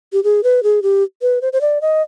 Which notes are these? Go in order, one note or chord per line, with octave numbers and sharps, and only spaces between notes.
G4
G#4
B4
G#4
G4
B4
C5
C5
D5
D#5